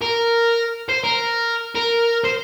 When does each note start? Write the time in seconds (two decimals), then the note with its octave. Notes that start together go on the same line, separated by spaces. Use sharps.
0.02 A#4
0.89 C5
1.04 A#4
1.75 A#4
2.24 C5